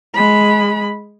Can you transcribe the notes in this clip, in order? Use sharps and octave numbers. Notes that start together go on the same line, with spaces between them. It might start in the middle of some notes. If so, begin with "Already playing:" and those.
G#3 B5